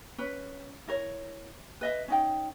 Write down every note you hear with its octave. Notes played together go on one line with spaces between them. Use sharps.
C#4 B4
E4 A#4 C#5
B4 D#5 E5
C#4 D#4 G5